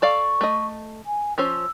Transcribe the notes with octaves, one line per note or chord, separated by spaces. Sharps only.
A4 D5 F5 C#6
A3 D#5
G#5
F3 C#4 C5 E6